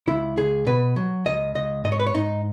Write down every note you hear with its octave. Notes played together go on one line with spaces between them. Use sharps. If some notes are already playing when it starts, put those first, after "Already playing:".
C#2 E4
C#2 G#4
B2 B4
F#3
C#2 D#5
C#2 D#5
G#2 D#5
C#5
B4
C#5
G#2 D#4